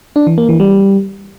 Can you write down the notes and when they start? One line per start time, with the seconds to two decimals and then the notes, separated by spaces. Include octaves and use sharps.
0.16 D4
0.27 E3
0.38 A#3
0.49 E3
0.60 G3